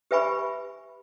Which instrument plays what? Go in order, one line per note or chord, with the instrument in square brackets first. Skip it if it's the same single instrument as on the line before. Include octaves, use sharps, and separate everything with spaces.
[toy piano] G4 B4 E5 G#5 B5 C#6